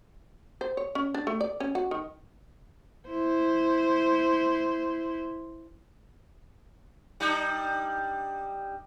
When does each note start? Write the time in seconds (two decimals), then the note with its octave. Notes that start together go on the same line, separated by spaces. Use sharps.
0.61 C5
0.77 C#5
0.95 C#4
1.14 D4
1.27 A3
1.41 D5
1.60 C#4
1.75 F#4
1.91 D#3
3.09 E4 C5
7.20 G3 D4 D#4